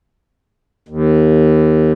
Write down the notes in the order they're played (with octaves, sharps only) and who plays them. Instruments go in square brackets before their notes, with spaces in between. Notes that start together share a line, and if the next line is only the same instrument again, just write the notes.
[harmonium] D#2